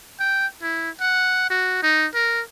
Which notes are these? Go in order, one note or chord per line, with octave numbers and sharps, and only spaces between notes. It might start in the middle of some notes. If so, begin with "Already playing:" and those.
G5
E4
F#5
F#4
D#4
A#4